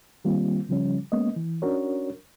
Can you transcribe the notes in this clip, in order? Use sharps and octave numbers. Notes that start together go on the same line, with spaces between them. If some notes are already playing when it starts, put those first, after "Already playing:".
D#3 G3 A#3 C4 F4
C#3 F3 G3 C#4
G#3 A#3 B3 C#4 D#5
E3
C#4 D4 F#4 A#4 C#5